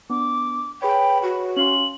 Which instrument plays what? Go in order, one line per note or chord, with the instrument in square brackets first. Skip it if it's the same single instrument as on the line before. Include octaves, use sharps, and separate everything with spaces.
[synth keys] B3 D4 [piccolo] D6
[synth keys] G#4 B4 C#5 [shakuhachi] G5 [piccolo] B5
[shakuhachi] F#4
[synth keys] C#4 F5 C6 [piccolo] F#7